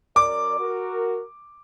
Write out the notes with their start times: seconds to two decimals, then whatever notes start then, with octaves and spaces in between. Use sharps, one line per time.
0.16 F#2 A#4 D5 D6
0.60 F#4 A#4